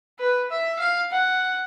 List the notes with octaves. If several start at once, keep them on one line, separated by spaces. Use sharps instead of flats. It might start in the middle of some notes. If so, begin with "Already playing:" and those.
B4
E5
F5
F#5